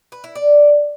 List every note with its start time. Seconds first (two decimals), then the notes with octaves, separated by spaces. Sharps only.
0.12 B4
0.24 E4
0.35 D5